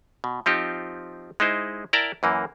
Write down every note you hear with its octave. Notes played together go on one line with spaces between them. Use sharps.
B2
F3 C4 D#4 F4 G4
G#3 D#4 E4 C5
E4 A#4 D5 G5 A5 A#5
F#2 E3 A#3